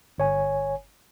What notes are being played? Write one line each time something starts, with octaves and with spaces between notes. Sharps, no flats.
G1 C#5 G#5